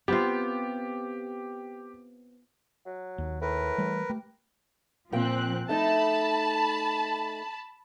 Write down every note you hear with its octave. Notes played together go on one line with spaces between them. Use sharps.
B3 C4 F4 G4
F#3
D#2
A2 A#4 B4
E3 G3 A3
A3 G4
A#2 F3 C4 G5 F#6
A3 D#4 A5 B5